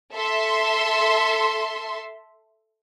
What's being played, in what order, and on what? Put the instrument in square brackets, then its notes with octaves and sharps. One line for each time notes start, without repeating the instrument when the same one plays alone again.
[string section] A4 E5 C6